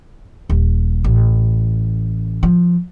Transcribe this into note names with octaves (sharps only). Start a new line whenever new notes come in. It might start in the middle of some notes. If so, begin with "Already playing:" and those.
D#1
A1
F3